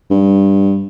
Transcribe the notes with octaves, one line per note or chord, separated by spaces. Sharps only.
G2